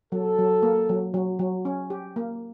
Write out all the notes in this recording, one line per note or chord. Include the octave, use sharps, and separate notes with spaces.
F#3 A4
F#3
A#3
F#3
F#3
F#3
C#4
G4
A#3